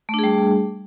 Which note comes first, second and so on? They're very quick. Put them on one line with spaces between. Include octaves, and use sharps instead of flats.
A3 D4 G#4 G3